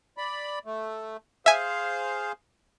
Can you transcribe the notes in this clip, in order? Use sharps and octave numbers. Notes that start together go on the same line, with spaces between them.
D5 B5
A3
G#4 C5 E5 F5 G#5